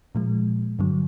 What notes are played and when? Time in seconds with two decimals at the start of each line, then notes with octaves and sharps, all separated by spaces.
0.15 A#2 F3 G#3
0.79 G2 D3 F#3